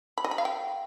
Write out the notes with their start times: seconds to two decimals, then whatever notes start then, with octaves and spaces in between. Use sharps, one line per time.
0.18 B5
0.24 D#5
0.31 B5
0.38 F5
0.45 G5